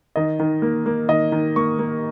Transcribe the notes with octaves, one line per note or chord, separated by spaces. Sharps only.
D#3 D#5
D#3
A#3
A#3
D#3 D#5
D#3
A#3 C#6
A#3